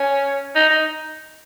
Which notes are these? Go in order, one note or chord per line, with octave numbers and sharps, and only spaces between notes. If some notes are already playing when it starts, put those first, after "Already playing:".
Already playing: C#4
D#4
D#4